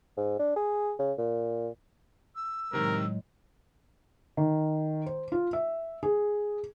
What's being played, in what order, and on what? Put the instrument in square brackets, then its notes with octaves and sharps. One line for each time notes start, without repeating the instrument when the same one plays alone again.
[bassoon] G#2
D4
G#4
C#3
A#2
[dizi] E6
[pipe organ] A2 F#3 G#3 [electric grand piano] C3 D#3 [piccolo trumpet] A#4
[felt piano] D#3
C5
F4
E5
G#4